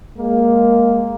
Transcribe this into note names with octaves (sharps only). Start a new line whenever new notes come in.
G#3 A#3